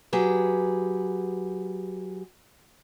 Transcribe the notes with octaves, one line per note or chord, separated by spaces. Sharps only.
F#3 G4 G#4 B4